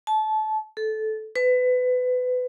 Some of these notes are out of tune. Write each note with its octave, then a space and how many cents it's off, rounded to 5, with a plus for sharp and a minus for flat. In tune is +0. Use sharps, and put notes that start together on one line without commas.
A5 -25
A4 -15
B4 +25